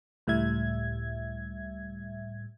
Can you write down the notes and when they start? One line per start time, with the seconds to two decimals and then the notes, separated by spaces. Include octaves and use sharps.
0.27 C#2 A2 G3 E5 G#6